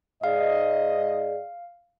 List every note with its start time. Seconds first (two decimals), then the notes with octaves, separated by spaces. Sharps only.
0.24 G#2 G#4 D5 D#5 F5